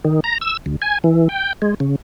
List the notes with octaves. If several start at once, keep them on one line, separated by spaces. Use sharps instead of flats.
D#3
A#5
E6
D2
G#5
E3
G5
G#3
C#3